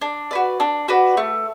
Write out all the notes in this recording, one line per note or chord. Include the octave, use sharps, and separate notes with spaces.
D4
F#4 B4 D5
D4
F#4 B4 D5
A3